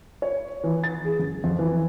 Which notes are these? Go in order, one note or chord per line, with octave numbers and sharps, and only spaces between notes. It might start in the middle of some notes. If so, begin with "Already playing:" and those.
C#5
E3
A6
G#4
F#2
F2
E3